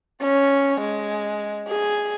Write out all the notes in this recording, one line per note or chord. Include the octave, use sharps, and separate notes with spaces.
C#4
G#3
G#4